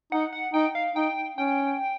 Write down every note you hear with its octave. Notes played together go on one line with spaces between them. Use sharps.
D#4 F#5
F#5
D#4 G5
F5
D#4 G5
C#4 G5